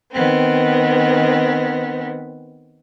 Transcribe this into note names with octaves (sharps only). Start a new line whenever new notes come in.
D#3 B3 C4